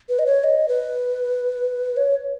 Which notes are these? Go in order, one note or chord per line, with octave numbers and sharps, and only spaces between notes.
B4
D#5
C#5
D#5
B4
C#5